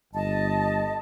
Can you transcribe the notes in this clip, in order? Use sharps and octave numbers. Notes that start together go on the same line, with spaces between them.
G1 D#5 A5